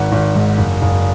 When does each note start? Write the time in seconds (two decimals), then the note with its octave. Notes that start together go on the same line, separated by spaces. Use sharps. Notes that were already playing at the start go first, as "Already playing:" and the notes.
Already playing: G#1 F#5
0.12 G#1
0.35 G#2
0.58 F#1
0.82 F#1